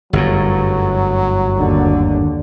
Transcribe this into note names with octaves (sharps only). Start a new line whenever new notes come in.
G1 F#2 A2 F#3
D#2 D3